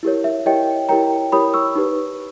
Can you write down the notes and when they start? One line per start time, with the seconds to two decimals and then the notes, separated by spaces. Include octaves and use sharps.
0.03 E4 G4 A#4 C#5
0.24 E5
0.46 E4 G4 A#4 C#5 D#5 G5
0.89 E4 G4 A#4 C#5 G5 A#5
1.32 E4 G4 A#4 C#5 B5 D#6
1.54 C#6 E6
1.75 D#4 G4 B4